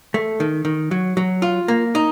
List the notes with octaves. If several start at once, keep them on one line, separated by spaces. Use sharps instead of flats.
A3
D#3
D#3
F#3
F#3
F4
A#3
D#4